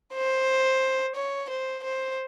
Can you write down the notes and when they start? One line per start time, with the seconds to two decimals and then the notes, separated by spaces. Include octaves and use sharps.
0.14 C5
1.16 C#5
1.50 C5
1.84 C5